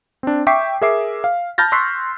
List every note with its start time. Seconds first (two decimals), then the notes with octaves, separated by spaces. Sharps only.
0.23 C4 D4
0.47 E5 G5 C#6 D6 B6 C7
0.81 G#4 A#4 E5 D6 C7
1.24 F5
1.58 A5 B5 F6 G6 A6 A#6
1.72 C6 C#6 E6 F#6 B6 C7